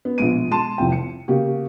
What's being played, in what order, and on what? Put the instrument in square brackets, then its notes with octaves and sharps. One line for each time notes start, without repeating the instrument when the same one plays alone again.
[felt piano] B3
A#1 B2 G#3 D7 D#7
G#3 A5 C6 D#7 E7
F1 C2 F2 G5
C#7
C#3 A#3 F#4 G4